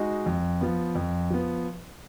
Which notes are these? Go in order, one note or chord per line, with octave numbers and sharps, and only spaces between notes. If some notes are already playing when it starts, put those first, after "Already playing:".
Already playing: G#3 D#4 F#4
F2
F3 B3
F2
F3 B3